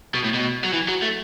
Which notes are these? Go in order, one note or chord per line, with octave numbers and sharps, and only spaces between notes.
B2
A2
B2
F#3
E3
F#3
A3